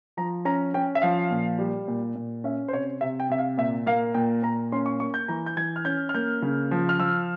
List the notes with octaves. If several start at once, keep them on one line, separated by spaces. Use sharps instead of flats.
F3 A#5
C#4 A#5
C#4 G5
E5
F3 F5
A#2
G3
A#2
A#2
C#4 E5
C5
C3 C#5
C3 E5
G5
C3 E5
F5
A#2 E5
A#3 F5
A#2 G5
A#2 A#5
C#4 C6
C#6
A#3 C#6
G6
E3 A#5
G6
E3 G#6
F6
C#4 G6
F6
A#3 G6
C#3
F3
F6
F3 E6